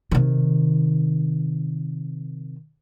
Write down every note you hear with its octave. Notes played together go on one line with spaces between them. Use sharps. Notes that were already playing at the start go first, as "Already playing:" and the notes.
C3 D#3